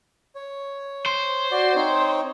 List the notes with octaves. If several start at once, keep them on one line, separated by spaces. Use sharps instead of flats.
C#5
C5
F#4 D5
C4 D#4 C#5